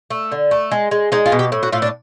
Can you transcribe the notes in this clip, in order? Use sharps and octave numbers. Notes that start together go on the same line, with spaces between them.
A3
D3
A3
G#3
G#3
G#3 D#4
F4
B2
G4
A2
F#4
A2 F4
D4